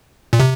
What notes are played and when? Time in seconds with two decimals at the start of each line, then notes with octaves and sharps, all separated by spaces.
0.33 A#2
0.40 C3